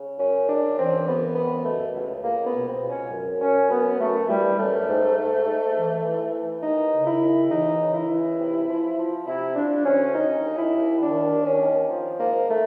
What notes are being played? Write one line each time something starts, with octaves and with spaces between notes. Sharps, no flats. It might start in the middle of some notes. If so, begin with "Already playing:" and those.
Already playing: C#3
F#2 C#4
C#3 D4
E3 C4
F#2 B3
C#2 B3
B2 A3
C#2
C#2 A#3
B3
B2
C4
C#2
C#4
F#2
F#2 C#4
F#2 B3
F#2 A3
E3 G3
F#2 A3
G#2
G#2
G#2
E3
E3
E3
D#2 D#4
C#3
E4
D#2
E3 D#4
C#3
E4
E3
C3
F3
F3
C3 E4
F3 D4
D2 C#4
D#3 D#4
D#2
E4
D#2
D#3 D4
D#2
C#4
D#3
F3
G#2 A#3
A3